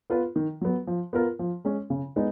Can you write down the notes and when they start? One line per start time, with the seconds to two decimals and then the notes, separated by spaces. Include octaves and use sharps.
0.10 B3 F4 B4
0.36 D#3
0.61 F#3 B3
0.87 F3
1.13 B3 F4 A#4
1.39 F3
1.65 G#3 C#4
1.90 C#3
2.16 G#3 B3 D#4